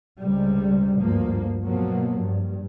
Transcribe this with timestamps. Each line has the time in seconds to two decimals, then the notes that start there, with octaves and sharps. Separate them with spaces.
0.21 C#2 C3 G3
1.01 D2 G2 F3 A#3
1.63 B2 F3 F#3 A#3
2.20 G2